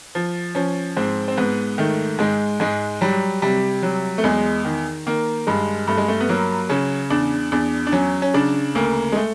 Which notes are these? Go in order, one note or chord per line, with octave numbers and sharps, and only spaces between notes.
F3
F3 C#4
G#2 C4
C4
G#2 B3
D#3 A3
G#2 G#3
G#2 G#3
F#3 G3
C3 G3
F#3
A3
E2 G#3
D#3
D#3 A#3
G2 G#3
G2 A3
G#3
A3
B3
F#3 A#3
C#3 C#4
E2 D4
E2 D4
D4
F#3 C#4
C#4
C#3 D4
D2 A#3
G#3
A3